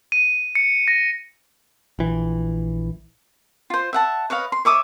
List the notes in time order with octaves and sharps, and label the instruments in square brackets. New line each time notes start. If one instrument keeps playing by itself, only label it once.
[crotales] D#7
C#7
A#6
[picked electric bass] A#1 E3
[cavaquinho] F4 C5
E5 F#5 A5
B4 C#5 D#5 F5
C6
C#5 E5 D6 D#6